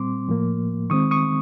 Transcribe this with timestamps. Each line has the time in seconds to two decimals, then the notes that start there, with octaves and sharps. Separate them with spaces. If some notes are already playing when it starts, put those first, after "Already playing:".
Already playing: A#2 G3 C4 C6 D6
0.28 A2 F3 A#3
0.90 D#3 G#3 C4 C#6 D#6
1.11 C#6 D#6